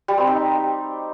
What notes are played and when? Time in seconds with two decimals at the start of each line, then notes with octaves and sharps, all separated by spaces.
0.08 G3
0.18 C4
0.27 D#4